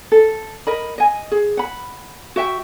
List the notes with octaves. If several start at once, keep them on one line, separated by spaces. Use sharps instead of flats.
A4
A#4 D#5 B5
D#5 G#5
G#4
F#5 B5
F#4 E5 G5